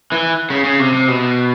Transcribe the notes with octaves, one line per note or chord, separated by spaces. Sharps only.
E3
C#3
C#3
C3
C3
B2